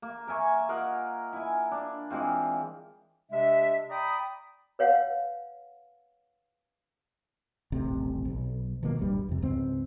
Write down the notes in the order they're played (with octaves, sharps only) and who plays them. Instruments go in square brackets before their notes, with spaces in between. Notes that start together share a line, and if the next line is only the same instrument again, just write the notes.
[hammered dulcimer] A#3
A#4 E5 G#5 C#6
F4 A#4 D#5 F#5
E4 G#5
D4
E3 G#3 C4 F4
[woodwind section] C3 G#3 D4 E5
D5 G5 A#5 B5 D#6
[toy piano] B4 C#5 F5 F#5
[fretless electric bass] D#1 A1 C3
B1
B2 D#3 F3 A#3
D#1 G#1 G2 G3
F2 C3
C#2 G#2 C4